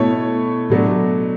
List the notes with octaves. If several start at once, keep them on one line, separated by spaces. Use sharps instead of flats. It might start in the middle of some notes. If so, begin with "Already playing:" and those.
Already playing: B2 A3 E4 A4 C#5
B2 F#3 A3 D4